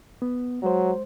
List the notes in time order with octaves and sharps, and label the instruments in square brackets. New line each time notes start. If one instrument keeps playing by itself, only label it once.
[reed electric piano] B3
[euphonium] F#3 [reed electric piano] G#3 C5